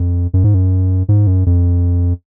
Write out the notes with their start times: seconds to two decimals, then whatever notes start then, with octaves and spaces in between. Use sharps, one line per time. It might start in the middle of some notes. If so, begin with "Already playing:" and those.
Already playing: F2
0.34 F#2
0.44 G#2
0.54 F#2
1.09 G#2
1.27 F#2
1.46 F2